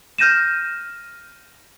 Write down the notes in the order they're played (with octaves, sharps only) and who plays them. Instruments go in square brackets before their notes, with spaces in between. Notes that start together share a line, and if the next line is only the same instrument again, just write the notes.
[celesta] F6 G6 A#6 D#7 E7